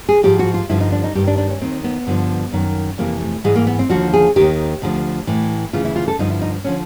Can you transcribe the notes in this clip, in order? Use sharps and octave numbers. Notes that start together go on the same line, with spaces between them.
G#4
G#2 F3 G4
F#4
F4
G2 D3 F3 E4
D#4
D4
D#4
G2 D#3 G4
D4
D4
C#4
D#2 D#3 C4
B3
G2 D3 F3
F#2 D#3
F2 C3 E3 A#3
A3
G#2 E3 G#3
A#3
B3
C4
D#2 D3 F3 F#4
G#4
D#2 D#3 G4
D2 D3 F3
A2 E3
D2 C#3 E3 F4
E4
F4
A4
G2 D3 F3 D#4
E4
D#4
D3 F3 C#4